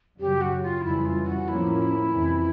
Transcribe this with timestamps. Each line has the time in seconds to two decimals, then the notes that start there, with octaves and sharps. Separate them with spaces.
0.19 F#2 C#3 F#3 G4
0.41 F#4
0.62 F4
0.83 F2 C#3 E3 G3 E4
1.05 F4
1.26 F#4
1.48 A2 F3 A#3 C#4 E4
2.11 F2 C3 E3